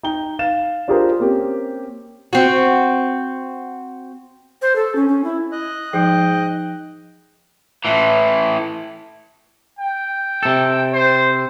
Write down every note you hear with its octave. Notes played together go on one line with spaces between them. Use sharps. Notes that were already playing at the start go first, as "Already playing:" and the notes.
D#4 G5 G7
F5 F6 A6 E7
D4 F4 G4 G#4 A#4 C5
A#3 C4 C#4 G4
C4 F#4
C5
A4
C#4
C#4
E4
D#5 F#6
G#2 F3 D#4 G5
A2 E3
G5
C3 A4
C5